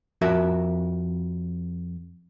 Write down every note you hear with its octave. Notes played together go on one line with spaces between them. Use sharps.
F2 F#4 A#4 E5